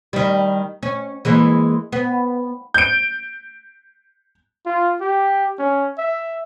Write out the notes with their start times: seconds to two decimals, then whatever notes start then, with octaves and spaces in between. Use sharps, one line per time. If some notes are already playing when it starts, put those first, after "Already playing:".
0.13 D#3 G3
0.83 C#4
1.25 E3 G#3 A#3
1.92 B3
2.74 G6 D7
4.66 F4
5.01 G4
5.59 C#4
5.98 E5